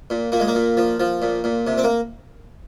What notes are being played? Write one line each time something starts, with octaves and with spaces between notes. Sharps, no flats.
A#2
A#2 A#3
G#3
A#3
A#2
F3
F3
A#2
A#2
C3
C4
A#3